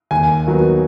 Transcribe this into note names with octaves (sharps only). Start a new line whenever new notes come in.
D#2 G#5
D#3 F#3 B3